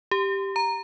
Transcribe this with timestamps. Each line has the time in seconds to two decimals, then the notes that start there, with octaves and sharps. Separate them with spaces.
0.11 G4
0.56 A#5